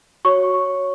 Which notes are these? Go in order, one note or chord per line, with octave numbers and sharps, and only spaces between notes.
F#4 C#5 C#6